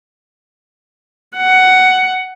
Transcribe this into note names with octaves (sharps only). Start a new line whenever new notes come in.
F#5